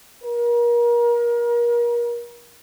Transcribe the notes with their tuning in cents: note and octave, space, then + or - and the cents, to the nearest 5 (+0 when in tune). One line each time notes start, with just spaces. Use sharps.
A#4 +35